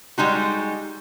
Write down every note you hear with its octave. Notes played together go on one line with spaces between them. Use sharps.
G3 G#3 D#4 F#4